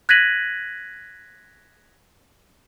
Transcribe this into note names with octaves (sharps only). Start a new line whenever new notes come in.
F#6 G#6 A#6 B6 D#7 F#7